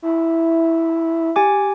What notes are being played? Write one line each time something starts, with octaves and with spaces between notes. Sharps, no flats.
E4
G4 G#5 D6